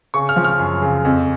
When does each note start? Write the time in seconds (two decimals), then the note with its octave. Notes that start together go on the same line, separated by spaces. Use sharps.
0.14 C#3 C#6
0.29 F6
0.36 F3
0.44 F6
0.59 F#2
0.82 C#3
1.05 F2